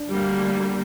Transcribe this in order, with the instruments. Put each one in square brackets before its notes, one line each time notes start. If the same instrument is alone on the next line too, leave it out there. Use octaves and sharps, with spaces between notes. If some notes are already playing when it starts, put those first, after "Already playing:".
Already playing: [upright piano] D4
[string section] D2 D3 G3 A#3